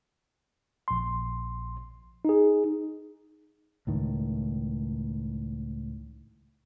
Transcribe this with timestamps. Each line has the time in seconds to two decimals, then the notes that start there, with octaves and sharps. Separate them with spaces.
0.88 A#1 C6
2.25 D#4 G#4
3.87 C#2 A2 D#3